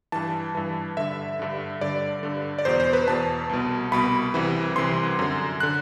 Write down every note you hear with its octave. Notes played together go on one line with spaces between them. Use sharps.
G2 E3 A5
G2 E3
G2 D3 E5
G2 D3
G2 D3 D5
G2 D3
D5
E2 B2 C5
C5
B4
E2 B2 A5
C2 B2
C2 B2 B5
C2 C3 E3
C2 C3 E3 C6
F#2 D3
D3 F#6